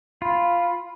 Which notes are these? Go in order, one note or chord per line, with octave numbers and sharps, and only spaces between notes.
F4 B5